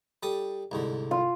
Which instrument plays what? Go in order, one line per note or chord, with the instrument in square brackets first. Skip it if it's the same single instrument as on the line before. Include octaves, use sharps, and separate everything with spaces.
[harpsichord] G3 A4 D#6
C2 G#2 D3
[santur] F4